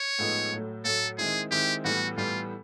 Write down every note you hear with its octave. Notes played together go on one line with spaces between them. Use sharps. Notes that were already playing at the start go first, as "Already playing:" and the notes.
Already playing: C#5
A2 F3 G#3 B3 D#4
A2 F#3 A3
A2 F#3 A3 A4
D#3 G#3 C4 E4 G#4
D#3 G#3 C4 E4 G4
A2 E3 G3 B3 F#4
A2 E3 G3 B3 F4